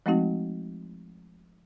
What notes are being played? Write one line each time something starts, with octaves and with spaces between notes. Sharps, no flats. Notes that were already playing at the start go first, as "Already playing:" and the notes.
F3 G#3 A3 C4 D#4 F#4